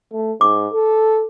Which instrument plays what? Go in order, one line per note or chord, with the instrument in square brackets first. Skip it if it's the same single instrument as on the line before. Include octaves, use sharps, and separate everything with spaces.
[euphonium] A3
[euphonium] G#2 [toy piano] D6
[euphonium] A4